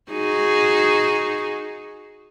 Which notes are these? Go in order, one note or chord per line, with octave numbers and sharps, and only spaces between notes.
D#4 F#4 G#4